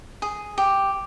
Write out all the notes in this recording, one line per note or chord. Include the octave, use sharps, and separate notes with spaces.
G#4
G4